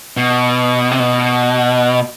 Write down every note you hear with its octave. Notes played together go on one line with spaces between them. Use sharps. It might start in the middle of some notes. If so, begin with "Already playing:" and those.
B2
C3
B2